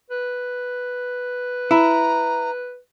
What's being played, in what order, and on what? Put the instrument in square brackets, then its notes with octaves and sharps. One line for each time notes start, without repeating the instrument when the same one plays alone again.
[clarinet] B4
[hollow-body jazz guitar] E4 [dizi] A#5